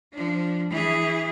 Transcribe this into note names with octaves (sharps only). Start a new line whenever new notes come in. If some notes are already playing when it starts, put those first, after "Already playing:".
F3 D4
E3 G#4